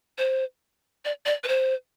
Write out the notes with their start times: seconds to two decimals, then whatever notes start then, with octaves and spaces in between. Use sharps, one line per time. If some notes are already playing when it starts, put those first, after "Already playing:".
0.18 C5
1.05 D5
1.26 D5
1.44 B4
1.48 C5